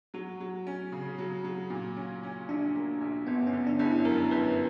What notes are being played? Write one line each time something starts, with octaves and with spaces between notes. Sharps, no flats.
F#3 F#4
F#3
C#4
C#3
F#3
F#3
A#2
C#4
C#4
A#1 D4
A#3
A#1
G1 B3
C#4
D3
D4
G1
E4
F#2 A#4
G1 B4